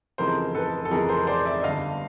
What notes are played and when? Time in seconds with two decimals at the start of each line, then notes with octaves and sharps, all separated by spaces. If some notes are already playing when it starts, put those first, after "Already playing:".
0.18 F1 F2 C#3 E3 A#4 C5
0.54 A4 B4
0.85 A4
0.91 F1 F2 C#3 E3 G#4 A#4
1.09 A#4 C5
1.27 C5 D5
1.45 D5 E5
1.63 G1 G2 D3 D#5 F5